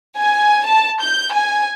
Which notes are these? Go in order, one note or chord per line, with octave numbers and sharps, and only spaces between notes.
G#5
A5
G6
G#5